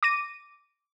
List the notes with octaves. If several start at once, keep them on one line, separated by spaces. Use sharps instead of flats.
D6 A#6 D#7